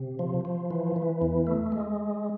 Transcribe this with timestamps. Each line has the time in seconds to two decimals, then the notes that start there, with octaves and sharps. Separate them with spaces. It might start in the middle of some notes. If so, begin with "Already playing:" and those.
Already playing: C3
0.19 F3
0.45 F3
0.70 E3
0.96 E3
1.22 E2
1.47 A3
1.72 G#3